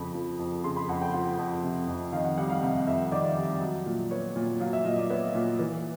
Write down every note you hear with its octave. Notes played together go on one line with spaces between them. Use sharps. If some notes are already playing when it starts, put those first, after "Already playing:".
Already playing: F2 C#3 B5
F3
F2
C#3 C6
B5
F2 F#5
G5
F3 F#5
F2
C3
F2
D#3 F5
F#5
G3 F#5
F5
C3 F5
F2 E5
D#3 D5
G3
F#3
A#2
B3 C#5
A#2
F#3 F5
E5
A#2 D#5
D5
B3 C#5
A#2
E3